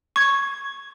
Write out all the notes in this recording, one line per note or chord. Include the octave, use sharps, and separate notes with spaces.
C#6 G#6